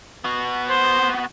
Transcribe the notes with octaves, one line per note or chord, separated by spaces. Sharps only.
B3 F#4
C5